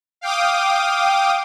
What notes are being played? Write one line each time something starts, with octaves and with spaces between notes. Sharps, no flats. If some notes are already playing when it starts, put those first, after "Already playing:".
F5 G5 D6 D#6